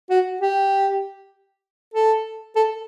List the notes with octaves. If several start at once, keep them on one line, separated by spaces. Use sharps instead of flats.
F#4
G4
A4
A4